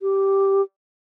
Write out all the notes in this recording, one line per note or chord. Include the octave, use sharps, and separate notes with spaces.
G4